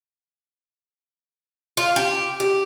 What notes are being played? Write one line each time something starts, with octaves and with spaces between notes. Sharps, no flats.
F4
G4
G4